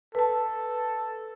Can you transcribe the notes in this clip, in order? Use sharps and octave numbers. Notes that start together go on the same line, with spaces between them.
A4 B4 A5